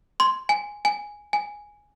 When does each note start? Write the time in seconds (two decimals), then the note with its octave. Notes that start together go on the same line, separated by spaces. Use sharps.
0.20 C6
0.49 G#5
0.85 G#5
1.33 G#5